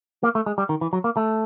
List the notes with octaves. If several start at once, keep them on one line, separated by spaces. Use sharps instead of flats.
A#3
A3
G#3
G3
D#3
E3
F#3
A#3
A3